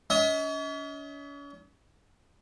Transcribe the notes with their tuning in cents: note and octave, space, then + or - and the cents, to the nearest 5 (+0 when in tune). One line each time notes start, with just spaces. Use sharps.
C#4 +40 D#5 +40